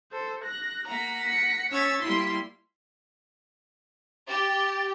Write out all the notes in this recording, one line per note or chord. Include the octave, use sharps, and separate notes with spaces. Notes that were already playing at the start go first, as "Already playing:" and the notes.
A4 C5
F#6 A#6
A#3 F#5 A#5 B6
A#6 C#7
C#4 C#5 E6 G#6 A6 B6
G3 A#3 E4 F4 C6 B6
G4 A6